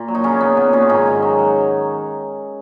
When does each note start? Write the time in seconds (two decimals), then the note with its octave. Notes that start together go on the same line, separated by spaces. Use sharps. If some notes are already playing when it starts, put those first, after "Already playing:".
Already playing: A#2
0.08 F#3
0.15 D#4
0.24 C#3 F#3 C#4
0.40 F#3 B3
0.57 A#2 B3
0.73 A#2 C#3 C#4
0.89 G#2 D#3 D#4
1.07 G#2
1.22 F#3
1.39 F#3